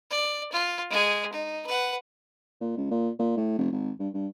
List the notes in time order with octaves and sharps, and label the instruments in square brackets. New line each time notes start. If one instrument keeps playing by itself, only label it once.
[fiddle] D5
F4
G#3 G#4
D#4
B4 F#5
[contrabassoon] A#2
C#2
A#2
A#2
A2
F1
G#1
G2
G2